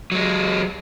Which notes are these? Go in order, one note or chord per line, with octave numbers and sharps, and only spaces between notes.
F#3 G#3